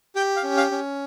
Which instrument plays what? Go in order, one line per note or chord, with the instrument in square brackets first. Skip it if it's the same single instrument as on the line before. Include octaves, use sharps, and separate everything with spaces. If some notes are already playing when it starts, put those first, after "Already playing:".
[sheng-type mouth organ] G4 G5
F5
C#4
F5
C#4